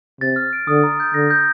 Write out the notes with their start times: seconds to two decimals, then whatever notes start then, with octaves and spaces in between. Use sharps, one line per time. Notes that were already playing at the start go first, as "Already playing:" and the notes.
0.21 C3 A6
0.36 F6
0.53 D7
0.67 D3 D#6
0.83 A#5
1.00 G6
1.14 D3 A#6
1.30 G6